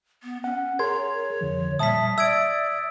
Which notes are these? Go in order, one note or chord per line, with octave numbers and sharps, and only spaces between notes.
B3
C#4 F#5
G#4 A#4 C#5 C6 G#6
F2 D3 F3
A#2 G3 E5 A5 D#6 B6
D5 E5 E6 G#6 D7